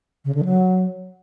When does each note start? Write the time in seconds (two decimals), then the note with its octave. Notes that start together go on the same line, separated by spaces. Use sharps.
0.24 C#3
0.34 D3
0.44 F#3